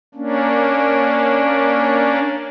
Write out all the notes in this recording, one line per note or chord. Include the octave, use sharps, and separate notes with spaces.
A#3 C#4 D4